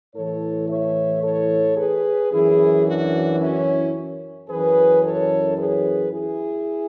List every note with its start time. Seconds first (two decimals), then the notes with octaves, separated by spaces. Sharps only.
0.15 A2 E3 A4 C#5
0.69 C#5 E5
1.23 A4 C#5
1.77 G#4 B4
2.32 F#2 E3 E4 G#4
2.86 D4 F#4
3.40 C#4 E4
4.49 F#2 E3 G#4 B4
5.03 A4 C#5
5.57 G#4 B4
6.12 E4 G#4